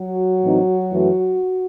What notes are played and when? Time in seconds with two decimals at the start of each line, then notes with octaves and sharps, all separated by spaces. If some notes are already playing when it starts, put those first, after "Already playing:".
Already playing: F#3 F#4
0.42 A2 E3 C4 D#4
0.91 F#2 E3 A3